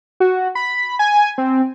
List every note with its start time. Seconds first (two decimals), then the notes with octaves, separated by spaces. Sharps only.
0.20 F#4
0.55 B5
0.99 G#5
1.38 C4